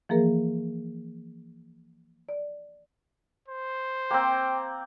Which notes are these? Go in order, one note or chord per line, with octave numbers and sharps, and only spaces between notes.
E3 F3 A#3 G#4 A#4
D5
C5
A#3 C4 G5